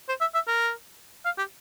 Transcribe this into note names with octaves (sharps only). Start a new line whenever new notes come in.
C5
E5
E5
A#4
F5
G4